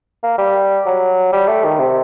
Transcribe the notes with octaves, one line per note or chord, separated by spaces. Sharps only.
A#3
G3
F#3
G3
A3
D#3
C3